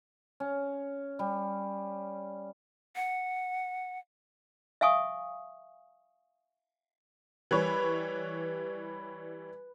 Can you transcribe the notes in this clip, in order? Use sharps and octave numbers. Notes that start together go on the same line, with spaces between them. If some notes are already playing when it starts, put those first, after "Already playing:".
C#4
G3
F#5
E5 F5 G#5 C#6 D#6
E3 G3 B4 C#5